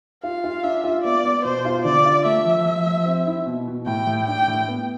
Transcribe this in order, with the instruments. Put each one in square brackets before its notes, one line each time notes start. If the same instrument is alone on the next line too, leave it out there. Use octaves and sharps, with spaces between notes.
[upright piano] F4 [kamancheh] F5
[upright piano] F4
[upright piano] D4 [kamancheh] E5
[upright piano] F4
[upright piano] B3 [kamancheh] D5
[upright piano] B3
[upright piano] B2 [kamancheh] C5
[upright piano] F4
[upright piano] D3 [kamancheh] D5
[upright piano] F4
[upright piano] A3 [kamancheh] E5
[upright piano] F3
F3
F3
C4
E4
B2
B2
[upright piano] A2 [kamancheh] G5
[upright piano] A2
[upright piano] D4 [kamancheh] G5
[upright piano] A2
B3